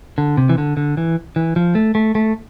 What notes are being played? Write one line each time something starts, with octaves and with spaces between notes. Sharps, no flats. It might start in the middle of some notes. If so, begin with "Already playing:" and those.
D3
C3
E3
D3
D3
E3
E3
F3
A3
A3
A3